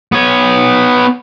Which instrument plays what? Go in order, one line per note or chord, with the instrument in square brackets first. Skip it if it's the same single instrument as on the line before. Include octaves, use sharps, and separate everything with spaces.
[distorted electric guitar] B3 C#5